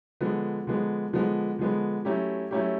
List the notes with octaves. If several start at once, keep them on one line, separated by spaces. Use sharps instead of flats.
D3 F3 G#3 B3
D3 F3 G#3 B3
D3 F3 G#3 B3
D3 F3 G#3 B3
F#3 A3 C#4 E4 G4
F#3 A3 C#4 E4 G4